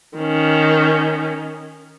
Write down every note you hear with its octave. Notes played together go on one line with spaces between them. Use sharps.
D#3 C#4